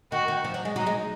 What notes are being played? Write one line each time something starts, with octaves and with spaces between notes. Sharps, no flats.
D#3 F#4
D#3
F3
F#3
G#3
F#3 D#4
G#3